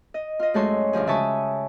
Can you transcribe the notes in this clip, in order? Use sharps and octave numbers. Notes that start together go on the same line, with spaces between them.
D#5
F4 D#5
F#2 G#3 A3 A4 C#5 C6
D2 G2 F3 G#4
C#3 E5 G#5 A5 C#6 D#6